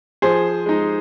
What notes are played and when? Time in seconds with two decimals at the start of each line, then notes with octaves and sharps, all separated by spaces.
0.22 F3 G#4 C5
0.66 G#3 D#4